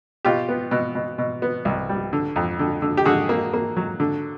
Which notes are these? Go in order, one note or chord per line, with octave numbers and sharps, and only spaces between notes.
B2 F4 G4
B3
B2
B2
B2
B3
C2
G3
D3
F2
D3
D3
G4
D3 F#4 G#4
A#3
A#3
F#3
D3